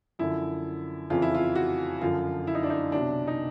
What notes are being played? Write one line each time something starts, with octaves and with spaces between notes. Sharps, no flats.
F#2 D3 F3 E4
F2 C#3 E3 F4
E4
F4
F#4
F#2 D3 F3 F4
E4
D#4
D4
D#4
C2 B2 F#3 D4
D#4